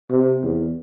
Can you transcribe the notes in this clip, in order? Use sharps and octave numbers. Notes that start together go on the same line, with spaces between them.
C3
E2